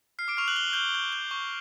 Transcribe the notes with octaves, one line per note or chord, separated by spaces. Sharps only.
F6 C7
D6 D7
C#6 F6 F7
F#6 F#7
F6 G7
F6 G6 G7
G6
G6
C#6